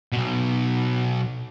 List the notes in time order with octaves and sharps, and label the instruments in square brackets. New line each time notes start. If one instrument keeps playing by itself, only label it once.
[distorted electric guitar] B1 B2